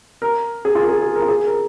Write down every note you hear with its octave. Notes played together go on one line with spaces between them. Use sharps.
A#4
G#4
F4
A#4
G#4
G#4
A#4
F4
G#4
A#4